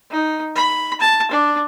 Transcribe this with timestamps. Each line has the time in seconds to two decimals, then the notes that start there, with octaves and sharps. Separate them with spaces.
0.11 D#4
0.56 B5
1.00 A5
1.31 D4